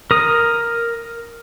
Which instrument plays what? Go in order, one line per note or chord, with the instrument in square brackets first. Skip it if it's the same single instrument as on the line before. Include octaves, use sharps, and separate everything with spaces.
[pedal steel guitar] A#4 D#6